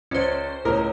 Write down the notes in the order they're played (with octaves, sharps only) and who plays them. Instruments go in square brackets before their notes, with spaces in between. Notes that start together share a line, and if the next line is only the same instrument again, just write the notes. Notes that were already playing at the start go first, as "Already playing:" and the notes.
[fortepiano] C#2 D5 [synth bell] C#4 C5
[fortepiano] C#2 A2 A#4